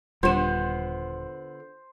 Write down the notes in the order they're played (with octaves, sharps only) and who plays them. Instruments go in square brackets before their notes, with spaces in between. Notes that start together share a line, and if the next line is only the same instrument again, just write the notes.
[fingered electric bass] D#1 G3 [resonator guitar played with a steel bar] D3 B3 [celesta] F4 E7 [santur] C5